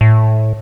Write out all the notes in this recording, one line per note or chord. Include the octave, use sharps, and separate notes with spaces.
A2